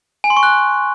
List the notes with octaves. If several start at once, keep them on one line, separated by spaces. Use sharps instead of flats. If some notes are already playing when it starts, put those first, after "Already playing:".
G#5
C6
C#6
F#6